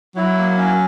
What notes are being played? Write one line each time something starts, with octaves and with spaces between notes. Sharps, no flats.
F#3 E4
A#3
C#4